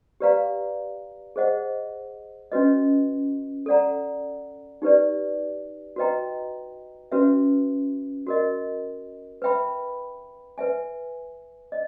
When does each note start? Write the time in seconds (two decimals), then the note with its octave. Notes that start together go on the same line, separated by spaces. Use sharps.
0.20 G4 B4 D5 F5 A#5
1.36 G#4 C5 D#5 F#5
2.52 C#4 F#4 B4 D#5
3.66 A4 D5 F#5 A#5
4.82 D#4 G4 B4 D5
5.96 F#4 B4 D#5 G5 A#5
7.12 C#4 F#4 B4 E5
8.27 F#4 A#4 D#5
9.42 B4 E5 G5 B5
10.58 B4 E5 G#5
11.72 D#5